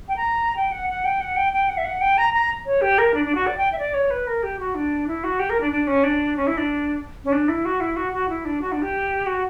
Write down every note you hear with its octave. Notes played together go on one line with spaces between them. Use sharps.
G5
A#5
G5
F#5
F#5
G5
F#5
G5
G5
F#5
E5
F#5
G5
A#5
A#5
C#5
G4
A#4
D4
D4
F#4
D5
G5
E5
D5
C#5
B4
A#4
G4
F#4
D4
E4
F#4
G4
A#4
D4
D4
C#4
D4
C#4
E4
D4
C#4
D4
E4
F#4
E4
F#4
F#4
E4
D4
F#4
D4
G4
F#4